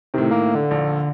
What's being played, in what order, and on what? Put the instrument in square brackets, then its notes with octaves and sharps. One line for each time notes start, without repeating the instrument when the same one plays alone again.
[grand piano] A2 D#3 [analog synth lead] C3
[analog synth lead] A#3
D3
[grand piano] A#1